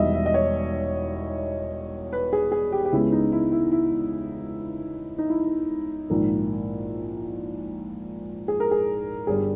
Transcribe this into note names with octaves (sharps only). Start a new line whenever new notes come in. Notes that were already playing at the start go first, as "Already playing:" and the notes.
Already playing: E1 E2 D#3 G3 D#5 E5
E5
D#5
C#5
B4
G#4
G#4
G4
G4
C#2 C#3 G#3 B3 E4
D#4
E4
E4
E4
D#4
E4
A#1 G#2 D#3 A#3
G#4
A#4
G#4
G1 G2 G3 G#4